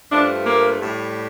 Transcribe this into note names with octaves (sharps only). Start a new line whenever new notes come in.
G2 F3 A3 D4
A#3
A2 G3